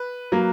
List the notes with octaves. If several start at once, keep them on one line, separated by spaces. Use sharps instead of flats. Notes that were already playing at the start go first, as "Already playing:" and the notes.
Already playing: B4
F#3 A#3